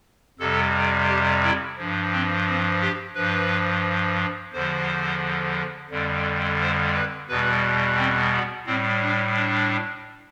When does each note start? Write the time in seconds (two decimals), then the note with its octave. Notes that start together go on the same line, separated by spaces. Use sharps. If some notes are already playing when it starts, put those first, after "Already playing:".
0.39 F2 C3 G3 A4
1.09 G4
1.43 E4
1.78 G2 F3
2.12 C4
2.46 C4
2.82 G4
3.15 G2 F3 B4
4.53 E2 D3 F3 C5
5.90 F2 D3 G3
6.60 C5
6.95 B4
7.29 E2 B2 G3 B4
7.97 C4
8.32 B3
8.66 A2 G3 C4
9.01 D4
9.36 D4